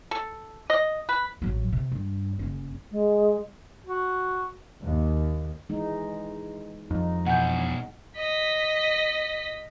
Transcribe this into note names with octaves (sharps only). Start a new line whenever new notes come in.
A4
D#5
B4
A1 F#3
C3
G2
F#1 C#4
G#3
F#4
D#2
E3 G#3 D#4
F2 D#4
E2 B2 F#5 G#5 G6
D#5 B6